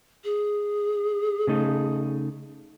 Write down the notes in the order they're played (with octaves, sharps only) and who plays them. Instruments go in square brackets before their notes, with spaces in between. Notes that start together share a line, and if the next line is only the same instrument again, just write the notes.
[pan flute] G#4
[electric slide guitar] C#3 A3 D#4